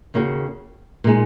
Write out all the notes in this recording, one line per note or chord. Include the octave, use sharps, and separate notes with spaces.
D#2 C#3 A#3 F#4
A#2 G#3 D#4